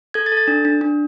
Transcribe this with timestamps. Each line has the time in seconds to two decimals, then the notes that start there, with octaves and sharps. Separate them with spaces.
0.14 A4 G#6
0.26 A6
0.32 A4
0.37 A6
0.48 D4
0.65 D4
0.81 D4